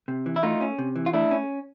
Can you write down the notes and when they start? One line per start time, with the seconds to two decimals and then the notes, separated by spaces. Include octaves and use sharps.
0.08 C3
0.26 E3
0.36 E4
0.43 A3 D#4 F4
0.61 C#4
0.79 C3
0.96 E3
1.06 F4
1.13 A3 D4 E4
1.31 C#4